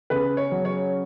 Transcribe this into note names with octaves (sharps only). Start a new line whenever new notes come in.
C#3 B4
C#5
F#3
C#5